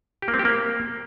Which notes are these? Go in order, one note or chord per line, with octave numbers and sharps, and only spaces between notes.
G4
A#3
C4
G4
A#3